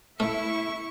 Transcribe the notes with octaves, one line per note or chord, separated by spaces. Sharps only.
A3 E4 A4 E5 C#6